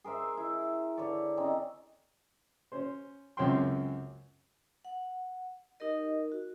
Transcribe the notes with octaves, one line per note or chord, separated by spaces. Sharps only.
G#4 A#4 C5 E5
E4
D3 B4 C#5 D5
C4 C#4 D#4
C#4 C5
C#2 F#2 C4 C#4 G5 C6
F#5
D#4 G4 A#4 D#5
F#4